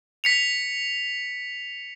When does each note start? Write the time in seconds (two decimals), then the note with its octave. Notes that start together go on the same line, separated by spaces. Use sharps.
0.24 B6 C#7 F7